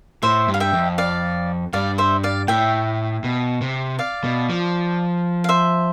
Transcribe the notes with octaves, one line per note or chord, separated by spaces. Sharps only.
A2 C5 E5
G2
F5
E5 G5
F2
D5 F5
G2 D5 F5
C5 E5
D5 F5
A2 E5 G5
B2
C3
D5 F5
B2
F3
F5
C5 E5